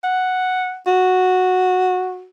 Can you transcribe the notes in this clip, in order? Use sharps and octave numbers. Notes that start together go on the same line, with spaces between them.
F#5
F#4